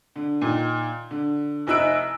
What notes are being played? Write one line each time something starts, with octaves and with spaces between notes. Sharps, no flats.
D3
A#2 D#3
D3
F1 D#4 E4 E6 F#6 D7